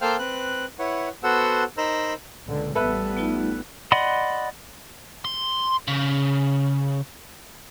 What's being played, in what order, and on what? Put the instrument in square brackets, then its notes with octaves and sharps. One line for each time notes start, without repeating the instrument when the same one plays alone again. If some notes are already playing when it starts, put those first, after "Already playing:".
[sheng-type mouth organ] A#3 A4 C5 F5 G5 F6
C4 B4 F#6
E4 B4 C#5 F#5
B3 F#4 A4 C5 F#5 E6
D#4 A#4 C5 A#5 B5 E6
[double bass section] C#2 A#2 D3
[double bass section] A1 G3 B3 [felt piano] A4 B4 E5
[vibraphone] A3 D#4 F4
[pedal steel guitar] D5 D#5 F#5 B5 C6
[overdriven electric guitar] C6
C#3